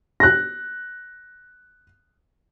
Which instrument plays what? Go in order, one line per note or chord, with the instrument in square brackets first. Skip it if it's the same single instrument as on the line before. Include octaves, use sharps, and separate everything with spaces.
[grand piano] F#6 A#6